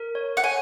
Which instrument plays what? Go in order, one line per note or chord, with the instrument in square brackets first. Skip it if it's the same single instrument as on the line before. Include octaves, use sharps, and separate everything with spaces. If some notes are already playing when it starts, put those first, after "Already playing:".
Already playing: [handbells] A#4
C#5
[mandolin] F#5
[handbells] C#5 [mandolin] G#5